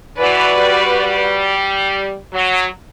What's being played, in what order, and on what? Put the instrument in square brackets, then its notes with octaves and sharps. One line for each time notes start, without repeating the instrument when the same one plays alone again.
[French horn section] E3 [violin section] F#4 B4 D5
[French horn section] G3
F#3